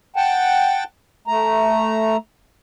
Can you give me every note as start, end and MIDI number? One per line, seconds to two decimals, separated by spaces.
0.16 0.84 78
0.16 0.84 79
0.16 0.84 81
1.27 2.17 57
1.27 2.17 82